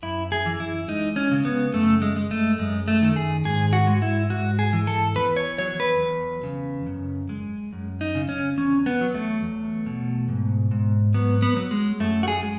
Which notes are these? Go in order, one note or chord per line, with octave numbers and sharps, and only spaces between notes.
F#2 E4
G#4
E3
E4
G#3 D#4
C#4
C#3
B3
F#2 A3
G#3
G#3
A3
F#2 G#3
A3
D#3
G#4
G#2 G#4
F#4
G#3
E4
G#2 F#4
G#4
E3
A4
E2 B4
C#5
F#3 C#5
B4
E2
C#3
F#2
G#3
F#2
D#4
C#3
C#4
E2 C#4
B3
F#3
A3
E2
B2
G#2
G#2
F#3 B3
B3
F#3
G#3
F#2 A3
F#4
G#4
G#3